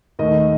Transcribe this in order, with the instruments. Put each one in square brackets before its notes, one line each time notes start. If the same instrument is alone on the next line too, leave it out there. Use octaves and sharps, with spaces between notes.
[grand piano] D#2 D#3 A3 D#5